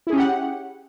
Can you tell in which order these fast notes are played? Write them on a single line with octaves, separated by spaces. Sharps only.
E4 G#4 C#4 G4 F#5